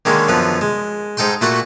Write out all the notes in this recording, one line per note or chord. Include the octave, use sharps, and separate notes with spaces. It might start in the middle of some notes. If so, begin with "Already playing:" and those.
D3 D#3 G#3 A#3 C#4
F#2 D3 F3 B3
G#3
G#2 D#4 A4 G5 C6
A#2 A3 F#4 A4 F#5